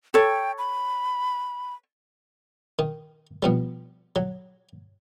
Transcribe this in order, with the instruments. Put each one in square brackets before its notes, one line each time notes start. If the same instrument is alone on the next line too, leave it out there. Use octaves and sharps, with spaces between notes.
[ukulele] A4 C#5 [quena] G5
[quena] B5
[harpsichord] D#3
B2 F3 G3
F#3